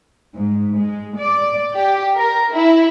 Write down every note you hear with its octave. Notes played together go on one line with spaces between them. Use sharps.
G#2
G#3
D5
G4
A#4
E4